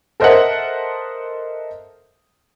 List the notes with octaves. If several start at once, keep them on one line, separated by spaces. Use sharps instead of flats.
A4 A#4 C5 D#5 E5 F#5